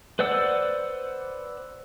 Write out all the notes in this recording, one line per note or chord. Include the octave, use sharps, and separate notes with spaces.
B4 C5 D5 F#5 E6